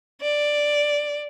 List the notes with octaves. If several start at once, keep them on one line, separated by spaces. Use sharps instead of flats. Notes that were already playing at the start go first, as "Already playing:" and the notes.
D5